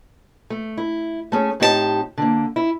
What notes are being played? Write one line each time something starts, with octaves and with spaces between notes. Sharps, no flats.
A3
E4
A3 C#4 G#4
A2 C4 D#4 G4 C#5 A5
D3 A#3
E4